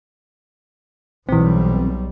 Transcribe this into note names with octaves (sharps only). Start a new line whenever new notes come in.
B1 E3 G3 C4